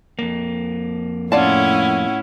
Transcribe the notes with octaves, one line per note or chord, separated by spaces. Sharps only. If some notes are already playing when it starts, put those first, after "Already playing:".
F2 A#3
A2 C#4 E4 F4 D5 F#5 A5